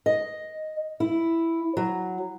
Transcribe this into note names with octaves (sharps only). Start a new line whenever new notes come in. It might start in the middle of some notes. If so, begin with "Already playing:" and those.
D#5
E4
F#3